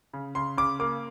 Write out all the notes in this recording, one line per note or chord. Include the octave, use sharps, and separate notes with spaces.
C#3
C#3 C6
C#3 D6
A#3 D6